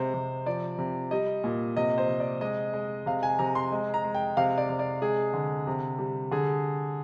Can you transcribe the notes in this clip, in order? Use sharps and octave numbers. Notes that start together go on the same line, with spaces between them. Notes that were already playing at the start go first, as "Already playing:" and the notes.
Already playing: C3 G#3 C5
C3
F3 D5
C3
G3 D#5
A#2
C3 D#5
C5
C3
D5
G#3 D#5
G#3
C3 F5
G#5
C3 A#5
C6
G#3
A#5
G#3
G5
C3 F5
D5
C3
D5
G#3 G#4
D3
C3
G3
D3 G#4